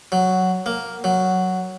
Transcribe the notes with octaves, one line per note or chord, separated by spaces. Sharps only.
F#3
A#3
F#3